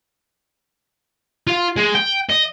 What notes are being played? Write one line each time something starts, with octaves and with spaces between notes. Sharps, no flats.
F4
G#3
G5
D#5